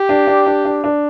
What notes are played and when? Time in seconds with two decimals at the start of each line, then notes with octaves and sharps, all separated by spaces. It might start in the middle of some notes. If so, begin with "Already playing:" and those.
Already playing: G4
0.09 D4
0.27 D4
0.47 D4
0.65 D4
0.84 D4